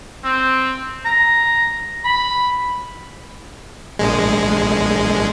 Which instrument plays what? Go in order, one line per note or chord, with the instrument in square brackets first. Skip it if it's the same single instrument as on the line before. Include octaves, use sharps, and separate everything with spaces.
[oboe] C4
A#5
B5
[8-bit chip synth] A#1 G#3